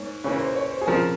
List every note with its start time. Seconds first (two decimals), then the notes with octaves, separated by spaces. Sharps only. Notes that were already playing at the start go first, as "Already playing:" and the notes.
Already playing: G#2 A#3 C#5
0.24 C#3 E3 A#3 C#5
0.40 C5
0.56 C#5
0.71 C5
0.81 G#4
0.87 C#3 F3 C4 A#4